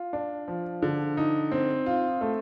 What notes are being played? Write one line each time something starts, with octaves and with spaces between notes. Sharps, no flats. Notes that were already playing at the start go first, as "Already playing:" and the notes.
Already playing: F4
D4
F3
D3
D#4
C4
F4
A3